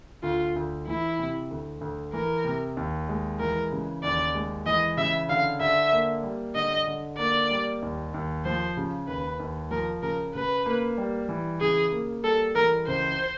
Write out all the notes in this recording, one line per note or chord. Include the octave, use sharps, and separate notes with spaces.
D2 F4
D2
E3 E4
C3
D2
D2
E3 A#4
C3
D#2
G#3
E3 A#4
C#3
D#2 D5
G#3
E3 D#5
C#3 E5
D3 F5
D3 E5
A#3
G3
D3 D#5
D3
A#3 D5
G3
D#2
D#2
F3 C5
C#3
D#2 B4
D#2
F3 A#4
C#3 A#4
C#3 B4
A#3
G3
E3
C#3 G#4
A#3
G3 A4
E3 A#4
C#2 C5